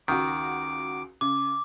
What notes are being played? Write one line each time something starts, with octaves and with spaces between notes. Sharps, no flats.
C#2 D#3 F#4 D6
C#3 D6